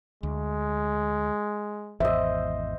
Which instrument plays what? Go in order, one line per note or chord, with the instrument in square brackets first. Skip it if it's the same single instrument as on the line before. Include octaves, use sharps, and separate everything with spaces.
[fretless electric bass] D2 [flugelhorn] G#3
[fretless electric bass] G#1 E2 [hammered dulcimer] C5 D#5 [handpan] E5